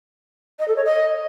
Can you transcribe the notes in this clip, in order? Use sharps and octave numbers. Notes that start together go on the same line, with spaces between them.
D#5
A4
C#5
D#5